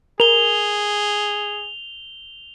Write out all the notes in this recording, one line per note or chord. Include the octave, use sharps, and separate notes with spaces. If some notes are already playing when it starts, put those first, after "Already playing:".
G#4 A#4 F7 G7